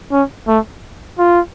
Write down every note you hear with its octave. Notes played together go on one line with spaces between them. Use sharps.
C#4
A3
F4